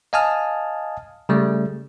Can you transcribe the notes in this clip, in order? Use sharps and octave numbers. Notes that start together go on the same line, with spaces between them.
D#5 F5 G#5 A5 D#6 F6
C#3 G3 A3